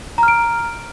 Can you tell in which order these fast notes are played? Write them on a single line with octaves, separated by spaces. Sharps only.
A#5 F6 D7